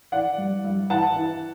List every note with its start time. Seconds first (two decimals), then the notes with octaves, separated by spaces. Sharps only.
0.12 E3 D5 F#5
0.38 G2
0.64 G2
0.90 E3 F#5 A5
1.16 E3